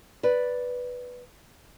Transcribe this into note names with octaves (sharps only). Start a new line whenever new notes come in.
B4 D5